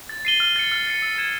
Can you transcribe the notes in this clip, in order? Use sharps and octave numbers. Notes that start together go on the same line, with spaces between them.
A6
C7 D#7 G7
F6
A6 C#7
F6
A6 C#7
E6
G#6 C#7 E7